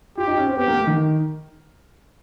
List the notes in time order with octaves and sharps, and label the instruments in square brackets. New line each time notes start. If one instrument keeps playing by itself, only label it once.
[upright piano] F4 [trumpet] G4
[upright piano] D#4
C#4
C4
[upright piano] B3 [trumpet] G4
[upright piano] A#3
A3
D#3